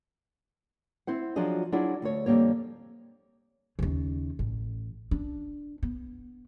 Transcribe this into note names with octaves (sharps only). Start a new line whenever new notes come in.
C4 E4 C5 F#5
F3 F#3 D4 F4 G#4 D#5
F#3 D4 E4 F4 G#4
D2 C#5
F2 D3 G3 A#3 C#5
D#2 C#3
A1
D4
B3